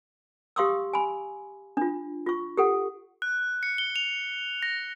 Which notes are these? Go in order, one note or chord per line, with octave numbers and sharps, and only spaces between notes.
G4 F5 C6 C#6 D#6 E6
G#5 B5
D4 F4
F4 C#6
G4 A4 F#5
F#6
C#7
G7
F7
A#6